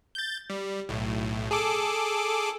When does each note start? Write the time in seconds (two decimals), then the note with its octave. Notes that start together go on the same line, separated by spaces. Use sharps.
0.15 G6 A6
0.50 G3
0.89 B1 A2
1.51 G#4 A4 D6